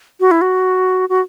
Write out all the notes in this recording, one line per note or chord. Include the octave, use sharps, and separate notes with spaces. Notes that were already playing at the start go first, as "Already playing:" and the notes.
F#4
E4
F#4
F#4